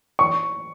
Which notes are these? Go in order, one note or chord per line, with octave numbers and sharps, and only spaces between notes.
C#6